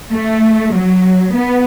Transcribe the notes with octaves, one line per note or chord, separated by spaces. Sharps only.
A3
F#3
B3